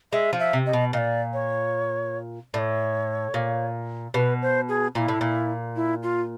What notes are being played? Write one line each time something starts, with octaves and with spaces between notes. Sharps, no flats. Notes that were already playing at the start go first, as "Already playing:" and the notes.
G#3 E5
F3
E5
C3
D#5
B2
A#2 D5 D#5
C#5
A2 C#5 D5
A#2
B2 B4
C5
G#4
A#2 E4 F4
A2
A#2
E4
F4